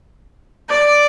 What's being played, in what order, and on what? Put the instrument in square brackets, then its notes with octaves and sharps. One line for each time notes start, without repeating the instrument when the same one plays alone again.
[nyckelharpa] D5